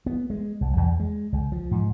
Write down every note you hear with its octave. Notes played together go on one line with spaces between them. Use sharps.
B3
G#3
C2
E2
G#3
C#2
F3
G#2